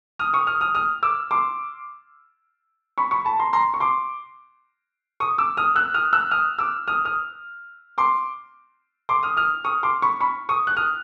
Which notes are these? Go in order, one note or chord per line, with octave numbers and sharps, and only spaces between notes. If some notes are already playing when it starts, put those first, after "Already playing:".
D#6 F6
C#6 D#6
D#6 F6
D#6 F6
D#6 F6
D6 E6
C6 D6
B5 C#6
B5 C#6
A5 B5
A#5 C6
A#5 C6
C#6
C6 D6
C#6 D#6
D6 E6
D#6 F6
E6 F#6
D#6 F6
E6 F#6
D#6 F6
D6 E6
D#6 F6
D#6 F6
C6 D6
C6 D6
D#6 F6
D#6 F6
C#6 D#6
C6 D6
B5 C#6
B5 C#6
C#6 D#6
F#6
D#6 F6